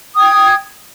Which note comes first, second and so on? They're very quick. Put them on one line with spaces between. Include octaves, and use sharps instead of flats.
D#6 G5 G#6